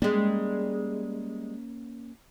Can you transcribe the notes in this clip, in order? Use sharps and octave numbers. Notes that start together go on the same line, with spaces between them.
G3 G#3 A#3 C#4